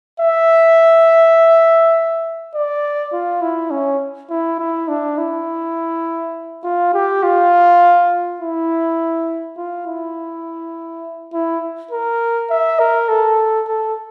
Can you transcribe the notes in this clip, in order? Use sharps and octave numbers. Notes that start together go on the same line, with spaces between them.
E5
D5
F4
E4
C#4
E4
E4
D4
E4
F4
G4
F4
E4
F4
E4
E4
A#4
E5
A#4
A4
A4